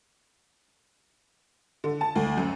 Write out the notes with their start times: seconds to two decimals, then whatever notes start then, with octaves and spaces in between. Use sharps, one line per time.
1.84 D3
2.01 A5
2.16 D2
2.38 F#2